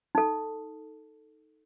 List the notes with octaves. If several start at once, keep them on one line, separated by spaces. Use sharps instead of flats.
D#4 A4